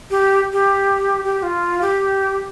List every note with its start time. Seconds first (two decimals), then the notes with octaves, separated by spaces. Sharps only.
0.10 G4
0.52 G4
1.24 G4
1.39 G4
1.43 F4
1.81 G4